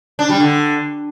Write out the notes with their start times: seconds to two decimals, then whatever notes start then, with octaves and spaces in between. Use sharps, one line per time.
0.19 D4
0.30 G3
0.40 D3